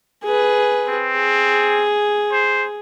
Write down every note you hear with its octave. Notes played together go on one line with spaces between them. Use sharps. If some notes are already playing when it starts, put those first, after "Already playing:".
G#4 B4
C4
G#4
C5